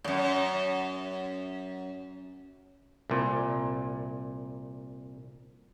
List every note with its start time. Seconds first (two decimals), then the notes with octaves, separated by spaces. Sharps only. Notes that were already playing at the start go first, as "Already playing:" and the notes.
0.04 F#2 A2
3.10 C2 A#2